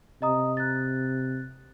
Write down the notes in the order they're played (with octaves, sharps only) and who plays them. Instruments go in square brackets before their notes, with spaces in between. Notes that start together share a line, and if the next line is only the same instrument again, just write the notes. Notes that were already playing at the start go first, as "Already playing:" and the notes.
[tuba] C3 [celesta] D#5 A#5 D#6
[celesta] F#6 A6